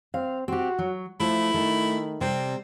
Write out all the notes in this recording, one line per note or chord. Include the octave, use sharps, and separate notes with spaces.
C4 F5
C4 F#4 G4
F#3
F3 A3 E4
D#3 A3
C3 G3 C4